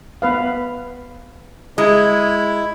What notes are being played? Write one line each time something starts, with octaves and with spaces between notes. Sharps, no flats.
B3 B4 F5
G#3 E4